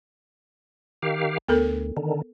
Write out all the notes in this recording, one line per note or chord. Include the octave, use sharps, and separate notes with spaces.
D#3 G4 F5
D2 B3 A4 A#4
D3 D#3